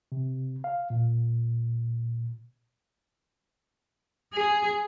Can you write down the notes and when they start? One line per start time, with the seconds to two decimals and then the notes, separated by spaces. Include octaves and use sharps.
0.12 C3
0.64 F5
0.90 A#2
4.33 G#4